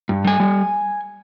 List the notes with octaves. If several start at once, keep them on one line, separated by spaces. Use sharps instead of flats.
G2
G3 G#5
G3